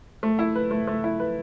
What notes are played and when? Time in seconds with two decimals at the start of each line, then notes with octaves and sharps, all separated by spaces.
0.23 A3
0.39 E4
0.55 B4
0.71 A3
0.87 A3
1.04 E4
1.20 B4